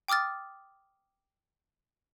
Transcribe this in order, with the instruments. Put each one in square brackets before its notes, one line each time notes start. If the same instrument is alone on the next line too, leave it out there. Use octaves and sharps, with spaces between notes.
[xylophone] G5 D6 D#6 F6 A6